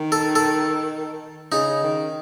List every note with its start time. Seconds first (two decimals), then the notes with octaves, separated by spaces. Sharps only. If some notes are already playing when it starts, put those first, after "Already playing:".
Already playing: D#3
0.12 A4
0.35 A4
1.52 C#3 D#4
1.83 D#3